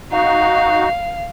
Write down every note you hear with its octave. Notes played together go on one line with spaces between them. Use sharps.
D#4 F#4 F5